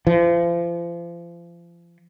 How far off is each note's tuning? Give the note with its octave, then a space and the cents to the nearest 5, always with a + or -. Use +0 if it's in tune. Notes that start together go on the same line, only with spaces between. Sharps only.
F3 -35